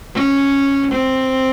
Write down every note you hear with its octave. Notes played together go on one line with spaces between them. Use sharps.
C#4
C4